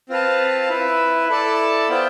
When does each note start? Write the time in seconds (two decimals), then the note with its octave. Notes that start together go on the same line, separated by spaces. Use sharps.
0.09 C4 F4 B4 F5 A5
0.69 E4 B4 E5
1.29 E4 A4 D5 A5
1.89 B3 F4 C5 E5 G5